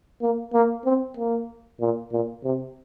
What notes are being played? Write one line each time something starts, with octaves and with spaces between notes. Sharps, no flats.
A#3
A#3
C4
A#3
A#2
A#2
C3